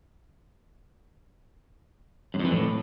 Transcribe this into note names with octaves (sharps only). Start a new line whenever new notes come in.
F#2
F2
E3
A2